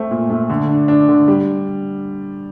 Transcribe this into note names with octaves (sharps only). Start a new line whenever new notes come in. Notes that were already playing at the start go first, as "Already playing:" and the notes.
Already playing: A3 C4
A#2
A3
D3
D4
D4
D3
G3